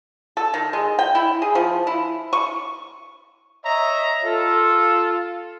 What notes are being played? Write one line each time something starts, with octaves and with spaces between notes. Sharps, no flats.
A4
D#3
G#3
G5
E4
G#4
F3
E4
C#6
C#5 D#5 E5 A#5
F4 A4